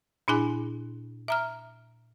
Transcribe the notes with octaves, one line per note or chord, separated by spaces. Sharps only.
A#2 D4 E4 G#4 G#5
E5 A#5 F6